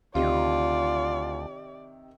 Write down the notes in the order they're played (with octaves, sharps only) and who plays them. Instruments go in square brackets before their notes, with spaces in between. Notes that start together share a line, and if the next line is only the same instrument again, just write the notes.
[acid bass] D2 [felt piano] C3 D#3 [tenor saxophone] F4 [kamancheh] D5